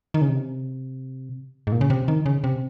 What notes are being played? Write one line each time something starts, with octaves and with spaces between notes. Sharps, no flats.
D#3
C#3
C3
G#2
A#2
C#3
C3
D#3
C#3
C3